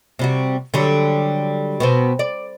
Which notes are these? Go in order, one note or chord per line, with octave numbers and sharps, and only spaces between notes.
C3 G3 F#4
D3 F#3 G3
B2 B3 C4
D5